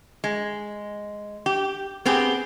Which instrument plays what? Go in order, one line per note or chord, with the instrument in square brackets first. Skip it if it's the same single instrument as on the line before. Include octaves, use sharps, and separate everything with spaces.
[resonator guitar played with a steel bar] G#3
G4
B3 C4 G4 G#4